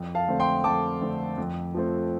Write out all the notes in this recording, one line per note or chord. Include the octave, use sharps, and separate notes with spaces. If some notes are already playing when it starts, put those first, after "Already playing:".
Already playing: F2
F5 A5
D3 A3 C4
G5 C6
F2 A5 D6
D3 A3 C4
F2
F3 A3 C4